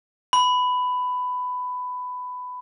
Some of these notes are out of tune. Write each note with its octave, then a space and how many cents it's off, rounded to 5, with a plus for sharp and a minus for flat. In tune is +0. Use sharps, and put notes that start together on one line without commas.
B5 +15